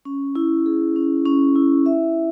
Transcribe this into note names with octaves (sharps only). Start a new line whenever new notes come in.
C#4
E4
G#4
C#4
C#4
E4
E5